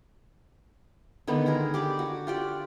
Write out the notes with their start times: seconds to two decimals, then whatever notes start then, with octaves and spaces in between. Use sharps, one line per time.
1.27 D3 D#3 G#3 B3
1.46 G#4 A#4 A#5
1.74 G4 D5 D6
1.99 F#4
2.27 F4 G4 D5